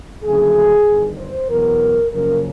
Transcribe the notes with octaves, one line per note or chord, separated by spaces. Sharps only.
F#1 F#2 D3 F3 A3 G#4
G1 G2 D#3
C5
E2 B2 F#3 B3 A#4
F#2 C#3 F3 A#3 C#4 A#4